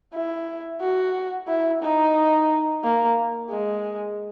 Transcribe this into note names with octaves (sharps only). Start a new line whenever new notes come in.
E4
F#4
E4
D#4
A#3
G#3